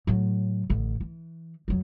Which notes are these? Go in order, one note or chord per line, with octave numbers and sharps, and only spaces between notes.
A2 F#3
A1 D3
E3
F2 F#3